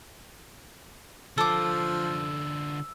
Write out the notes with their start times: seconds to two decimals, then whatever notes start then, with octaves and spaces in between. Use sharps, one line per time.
1.38 D3 F3 F4 A4 D6 E6